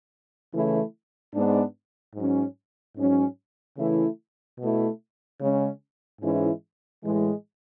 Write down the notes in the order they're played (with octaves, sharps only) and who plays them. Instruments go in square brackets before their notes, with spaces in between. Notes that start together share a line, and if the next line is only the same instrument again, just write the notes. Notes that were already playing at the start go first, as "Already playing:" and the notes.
[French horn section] C#3 E3 A3 E4
G#2 G#3 B3 D4
G#2 F#3 C#4
G#2 F#3 C#4
C#3 E3 A3 E4
B2 A3 E4
C#3 G#3 C#4
G#2 E3 G#3 C#4 E4
A2 E3 G#3